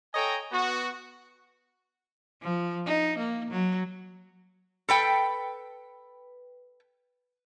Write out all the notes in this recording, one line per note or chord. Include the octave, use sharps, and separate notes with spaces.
A4 C#5 D#5 G5 G#5 A#5
B3 F#4
F3
D#4
A#3
F#3
A4 B4 G5